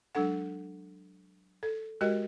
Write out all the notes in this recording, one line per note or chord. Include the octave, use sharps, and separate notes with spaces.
F#3 G#3 D4 A4 F#5
A4
G#3 F#4 G4 A#4 D#5